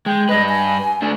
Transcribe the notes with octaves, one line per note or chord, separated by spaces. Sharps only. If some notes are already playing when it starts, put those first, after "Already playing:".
G#3 G5
G2 B4 D#5
G#5
A3 D4